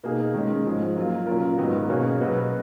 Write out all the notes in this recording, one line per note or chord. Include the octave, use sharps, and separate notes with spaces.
B2 A#3 D#4 G#4
D#3 G#3 C#4
G#2 F3 G#3
F#3 A#3 F4
A#2 F#3 C#4 F4 A#4
G#2 D#3 F#3 B3 F#4
B2 A#3 C#4 G#4 C#5
B2 F#3 B3 F#4 B4